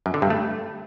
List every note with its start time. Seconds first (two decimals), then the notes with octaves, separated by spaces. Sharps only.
0.06 F#2
0.14 D3
0.22 G2
0.30 A3